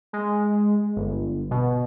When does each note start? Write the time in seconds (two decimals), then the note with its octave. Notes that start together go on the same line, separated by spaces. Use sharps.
0.13 G#3
0.96 G1
1.51 B2